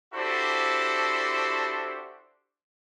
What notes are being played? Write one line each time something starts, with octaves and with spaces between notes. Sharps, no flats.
D4 E4 F#4 G4 A4 C5